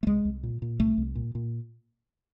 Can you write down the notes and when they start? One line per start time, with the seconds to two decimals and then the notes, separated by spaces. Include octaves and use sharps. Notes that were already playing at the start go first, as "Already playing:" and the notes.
0.03 A3
0.06 C2 G#3
0.25 C2
0.43 A#2
0.62 A#2
0.79 C2 A3
0.98 C2
1.15 A#2
1.35 A#2